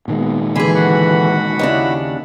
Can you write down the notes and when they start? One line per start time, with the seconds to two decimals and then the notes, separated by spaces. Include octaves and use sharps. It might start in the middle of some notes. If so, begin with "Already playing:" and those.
0.08 A#2 D#3 G#3 B3
0.56 D3 E3 G#4 G#5 B5 C6
0.75 F#4 F#5 B5
1.59 D#2 C#3 D4 E4